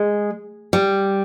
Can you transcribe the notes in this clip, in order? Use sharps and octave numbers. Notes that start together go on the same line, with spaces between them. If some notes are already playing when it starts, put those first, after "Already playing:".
Already playing: G#3
G3